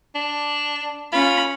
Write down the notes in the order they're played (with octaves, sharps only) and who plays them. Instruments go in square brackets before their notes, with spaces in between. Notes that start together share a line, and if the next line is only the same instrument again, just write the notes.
[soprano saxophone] D4
[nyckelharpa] C#4 B5 [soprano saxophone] F4